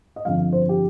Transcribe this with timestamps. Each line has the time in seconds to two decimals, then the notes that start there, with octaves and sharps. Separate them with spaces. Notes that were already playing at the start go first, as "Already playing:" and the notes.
0.16 D#5
0.25 G1 F2 F3 F5
0.53 C5
0.69 G4